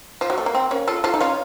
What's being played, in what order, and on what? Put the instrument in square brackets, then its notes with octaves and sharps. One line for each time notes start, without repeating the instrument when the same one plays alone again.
[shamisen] F3
F#3
A3
A#3
C4
A#3 C#4
F4 A4
F4 A4
D#4
C#4 F4